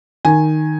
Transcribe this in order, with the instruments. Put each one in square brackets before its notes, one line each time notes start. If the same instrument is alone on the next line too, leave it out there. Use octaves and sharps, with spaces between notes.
[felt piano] D#3 G#5